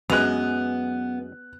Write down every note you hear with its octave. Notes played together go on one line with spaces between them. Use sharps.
F#2 G#3 B3 F#6 F7